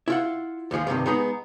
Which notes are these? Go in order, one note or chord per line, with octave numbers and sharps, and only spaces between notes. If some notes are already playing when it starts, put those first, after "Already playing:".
E4 F4 F#5
D#2 G#2 F3 G#3
D2 G2 C3 D#3
G#3 B3 D#4 G#4 A#5